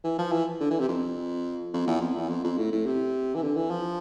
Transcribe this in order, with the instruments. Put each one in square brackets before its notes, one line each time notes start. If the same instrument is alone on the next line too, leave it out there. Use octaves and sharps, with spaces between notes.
[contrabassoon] E3
F3
E3
D3
E3
C3
F2
F2
E2
F2
E2
F2
F2
A2
A2
C3
E3
D3
E3
F3